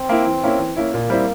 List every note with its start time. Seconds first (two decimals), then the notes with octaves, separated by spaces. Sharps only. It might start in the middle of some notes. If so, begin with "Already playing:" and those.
Already playing: C4
0.09 A#3 E4
0.27 E3
0.44 A#3 C#4 E4
0.59 E3
0.76 A#3 C#4 E4
0.93 A#2 A#3
1.10 G3 C4 E4